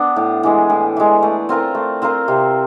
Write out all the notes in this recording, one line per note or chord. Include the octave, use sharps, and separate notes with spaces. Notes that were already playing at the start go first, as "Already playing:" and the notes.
Already playing: B3 D4
A2
E3 G#3
A2
E3 G#3
A3
C4 F4 A#4
A3
C4 F4 A#4
C3